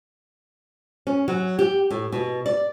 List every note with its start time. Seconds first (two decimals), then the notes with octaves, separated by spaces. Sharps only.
1.07 C#4
1.28 F#3
1.59 G4
1.90 A2
2.12 B2
2.46 D5